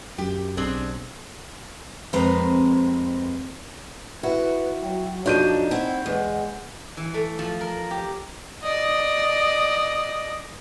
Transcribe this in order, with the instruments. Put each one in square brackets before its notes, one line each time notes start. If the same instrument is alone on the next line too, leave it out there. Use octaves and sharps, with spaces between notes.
[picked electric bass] F#2 [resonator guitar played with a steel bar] G4
[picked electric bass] B1 [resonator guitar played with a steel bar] C4 D4 G#4
[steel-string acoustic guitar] F2 G#3 C4 A#4 B4 A#5
[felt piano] E4 [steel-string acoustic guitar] F#4 [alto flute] B4
[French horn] F#3 [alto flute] G5
[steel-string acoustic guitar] F2 F3 D4 [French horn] D#4 [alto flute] F#4 [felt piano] C#5 G6 D#7
[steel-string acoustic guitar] C4 E4 [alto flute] F#5
[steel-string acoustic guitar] E2 [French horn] G#3
[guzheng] E3
A3
F3
A#4
G4
[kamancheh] D5 D#5